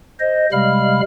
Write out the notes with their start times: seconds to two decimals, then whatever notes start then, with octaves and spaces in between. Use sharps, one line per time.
0.20 C5 D#5
0.52 C3 G3 G#3 F5 B5 F6